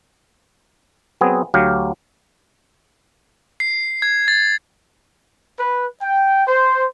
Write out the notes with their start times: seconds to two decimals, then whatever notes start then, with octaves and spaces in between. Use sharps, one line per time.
1.21 F#3 B3 C4 G#4
1.54 D2 F#3 G4 F5
3.60 C7
4.02 G#6
4.28 A6
5.59 B4
6.01 G5
6.47 C5